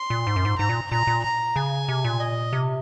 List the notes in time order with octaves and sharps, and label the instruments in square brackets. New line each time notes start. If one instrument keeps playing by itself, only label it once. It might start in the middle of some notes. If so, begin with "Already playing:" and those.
Already playing: [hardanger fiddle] C6
[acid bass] A#2
G#2
F#2
G#2
[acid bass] G#2 [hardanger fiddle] A#5
[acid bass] A#2
[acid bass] A#2 [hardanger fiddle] A#5
[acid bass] A#2
[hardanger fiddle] A#5
[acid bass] C#3 [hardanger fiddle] G#5
[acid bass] C3
A#2
[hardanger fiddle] D#5
[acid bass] C3